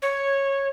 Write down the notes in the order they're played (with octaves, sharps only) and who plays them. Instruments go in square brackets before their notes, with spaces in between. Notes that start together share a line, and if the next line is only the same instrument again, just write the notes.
[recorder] C#5